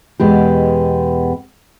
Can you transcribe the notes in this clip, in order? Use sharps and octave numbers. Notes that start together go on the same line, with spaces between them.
E2 B2 G#3 B3 G4